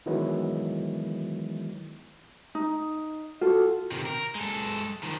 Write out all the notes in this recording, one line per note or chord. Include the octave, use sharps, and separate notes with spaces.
D#3 E3 F#3 G#3 B3 E4
D#4
F4 F#4 A4
C3 D#3
A#4
G#3 A4
D#3 F3